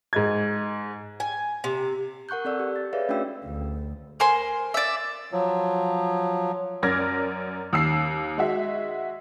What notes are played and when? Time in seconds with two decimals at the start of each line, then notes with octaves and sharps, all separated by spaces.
0.13 G#2 D#5 G#6
1.20 G#5
1.64 C3
2.29 A#4 F#5 C#6 F#6 G6
2.45 C4 A4 D5 E6
2.59 G4
2.76 A6
2.93 G#4 B4 C#5 D5 E5 F5
3.09 A3 C#4 D4 F#4 G5 E6
3.45 D2
4.20 A#4 C5 G#5 C6
4.74 D5 E5
5.32 F3 F#3
6.83 F#2 A#4 D5 F6 G#6 A#6
7.73 D#2 E6 C7
8.38 G#3 F#4 E5